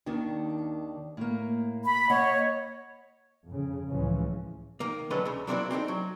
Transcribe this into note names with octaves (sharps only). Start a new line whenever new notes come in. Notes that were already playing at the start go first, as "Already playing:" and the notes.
D#2 D#3 D4
A2 A#3
B5
A#3 C#5 D#5 F#5
F2 C#3
C#2 A2 C#3 E3 F3 C#4
D#3 A#3
D3 F#3 G#3 C#4 A4 B4
C#2 C#3
F#3 A#3 C4 D4 E4 F#4
C4 D4 D#4 A4
F#3